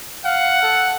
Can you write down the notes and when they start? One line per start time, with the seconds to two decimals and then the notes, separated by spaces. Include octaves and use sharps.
0.25 F5 F#5
0.62 A4